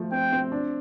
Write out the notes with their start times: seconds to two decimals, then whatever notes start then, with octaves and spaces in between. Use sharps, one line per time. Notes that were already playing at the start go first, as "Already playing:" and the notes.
Already playing: F3 A3
0.12 C4 G5
0.32 C4
0.52 D4